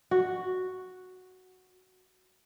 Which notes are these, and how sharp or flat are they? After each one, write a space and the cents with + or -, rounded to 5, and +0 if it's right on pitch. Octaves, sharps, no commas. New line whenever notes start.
F#4 +0